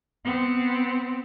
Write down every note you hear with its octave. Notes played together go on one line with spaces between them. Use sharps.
B3 C4